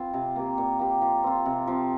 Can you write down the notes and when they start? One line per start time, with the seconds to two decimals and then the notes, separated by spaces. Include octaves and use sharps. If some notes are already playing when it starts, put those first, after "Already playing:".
Already playing: C4 F4
0.13 C3
0.36 A#3 G4
0.58 A#2
0.79 A#3 G4
1.02 F3
1.24 C4 F4
1.46 C3
1.67 F3 C4